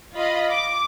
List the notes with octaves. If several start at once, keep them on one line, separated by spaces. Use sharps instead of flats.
F4 D#5 B5
D6